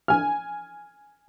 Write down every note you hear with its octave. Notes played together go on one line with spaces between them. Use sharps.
G#5 F6